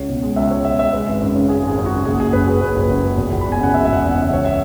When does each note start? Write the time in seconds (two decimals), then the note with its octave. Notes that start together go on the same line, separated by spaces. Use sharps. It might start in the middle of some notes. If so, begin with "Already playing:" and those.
Already playing: C#2 C#3 C#5
0.09 B2
0.23 G#3
0.36 C#2 E5
0.51 C#2 C#5
0.64 B2 E5
0.79 G#3 E5
0.93 G#3 B4
1.07 G#1
1.21 F#2
1.36 C#3
1.48 G#3 G#4
1.62 G#1
1.68 G#4
1.78 F#2
1.86 F#4
1.91 C#3
2.05 F#1 G#4
2.20 F#1 G#4
2.33 F#2 B4
2.47 F#3 G#4
2.61 F#1 B4
2.76 F#1
2.90 F#2
3.04 F#3
3.17 E1
3.32 E1
3.41 B5
3.46 E2
3.52 G#5
3.60 C#3 F#5
3.74 E1 E5
3.85 E5
3.88 E1
3.93 F#5
4.02 E2
4.11 F#5
4.16 C#3
4.22 E5
4.30 C#2 C#5
4.45 E5